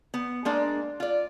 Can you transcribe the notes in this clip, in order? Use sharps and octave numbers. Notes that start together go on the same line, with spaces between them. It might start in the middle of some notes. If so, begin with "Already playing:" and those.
B3
G#3 A#3 D4
F4 D5